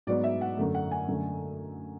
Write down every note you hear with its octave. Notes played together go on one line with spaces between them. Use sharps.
G#2 F#3 B3 D5
E5
F#5
F#2 D3 A3
F#5
G#5
F#2 D3 A3